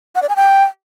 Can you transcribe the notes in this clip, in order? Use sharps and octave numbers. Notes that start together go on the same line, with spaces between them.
F#5
D5
G#5
G5